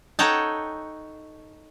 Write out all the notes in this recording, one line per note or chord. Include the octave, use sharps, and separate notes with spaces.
D#4 A4 C#5 F#5 G5 A5